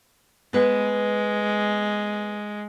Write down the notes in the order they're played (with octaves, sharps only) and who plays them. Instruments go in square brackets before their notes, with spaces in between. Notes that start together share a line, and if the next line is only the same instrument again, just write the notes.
[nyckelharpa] G#3 [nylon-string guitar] B3 B4